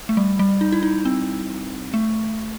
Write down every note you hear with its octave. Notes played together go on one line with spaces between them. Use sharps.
A3
G3
G3
D#4
E4
D#4
C4
A3